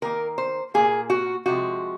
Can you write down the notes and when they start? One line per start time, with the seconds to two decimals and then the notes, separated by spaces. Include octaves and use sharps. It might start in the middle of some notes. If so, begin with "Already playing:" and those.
0.02 D#3 A#3 A#4
0.38 C5
0.74 A#2 F3 A#3 G#4
1.10 F#4
1.46 C3 F3 G#3 F#4